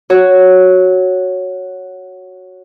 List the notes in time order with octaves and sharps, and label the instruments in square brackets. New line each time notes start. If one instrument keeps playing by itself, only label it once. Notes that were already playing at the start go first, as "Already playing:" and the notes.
[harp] F#4 C#5